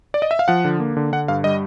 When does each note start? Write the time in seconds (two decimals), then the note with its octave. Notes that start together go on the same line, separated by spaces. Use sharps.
0.14 D5
0.22 D#5
0.31 E5
0.39 F5
0.48 F3 F#5
0.65 D3
0.80 A#3
0.97 D3
1.12 D3 F#5
1.28 G2 F5
1.44 G3 D#5